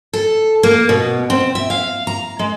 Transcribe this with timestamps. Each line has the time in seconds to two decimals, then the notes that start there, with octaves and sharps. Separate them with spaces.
0.13 A4
0.63 A#3
0.89 B2
1.30 C4
1.55 E5
1.70 F5
2.07 A#5
2.39 G#3